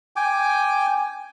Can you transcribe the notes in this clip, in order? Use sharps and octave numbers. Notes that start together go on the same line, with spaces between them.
G5 G#5 D6